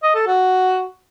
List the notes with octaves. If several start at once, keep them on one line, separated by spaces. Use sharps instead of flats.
D#5
A4
F#4